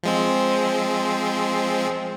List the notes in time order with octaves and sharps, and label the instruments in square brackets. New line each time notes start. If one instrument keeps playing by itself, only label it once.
[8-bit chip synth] F3 G#3 C4